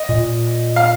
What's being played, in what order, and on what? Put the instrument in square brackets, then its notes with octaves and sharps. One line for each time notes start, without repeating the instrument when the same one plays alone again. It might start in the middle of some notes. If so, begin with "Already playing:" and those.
Already playing: [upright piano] D#5
[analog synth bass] A#2
[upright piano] F5